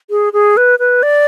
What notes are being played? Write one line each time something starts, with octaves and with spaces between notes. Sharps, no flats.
G#4
G#4
B4
B4
D5